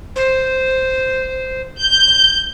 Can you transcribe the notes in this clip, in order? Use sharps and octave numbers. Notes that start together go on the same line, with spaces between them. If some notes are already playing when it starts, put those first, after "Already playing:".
C5
G6